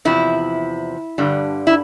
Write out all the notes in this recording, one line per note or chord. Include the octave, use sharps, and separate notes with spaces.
E2 C3 F3 E4
G2 D3 G3
E4